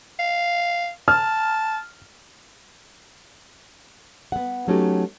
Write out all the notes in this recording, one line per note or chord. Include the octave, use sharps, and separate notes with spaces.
F5
A5 F6
B3 F#5
F#3 A3 C#4 D#4 F#4 G4